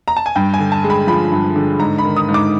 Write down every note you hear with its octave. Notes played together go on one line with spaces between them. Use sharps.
A#5
A5
G#5
G2 G5
G#5
D3
A5
G#3
B5
F3 B5
G2
D3
G#2 A#5
B5
D#3
D#6
G#2
D6